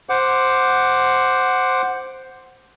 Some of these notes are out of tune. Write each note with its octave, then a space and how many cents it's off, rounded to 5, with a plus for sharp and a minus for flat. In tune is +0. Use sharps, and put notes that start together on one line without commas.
C5 +0 F#5 +0 D6 +0